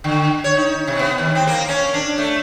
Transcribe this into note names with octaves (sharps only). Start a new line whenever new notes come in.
D3
C#5
D#4
C3
B3
D#2
C4
A#3
C#4
D4
A3